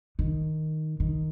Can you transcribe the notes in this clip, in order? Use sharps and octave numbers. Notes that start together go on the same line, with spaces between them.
D#3
D#3